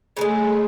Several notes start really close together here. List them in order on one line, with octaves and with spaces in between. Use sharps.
C#3 E3 A3 G#3